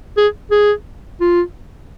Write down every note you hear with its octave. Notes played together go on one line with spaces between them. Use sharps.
G#4
G#4
F4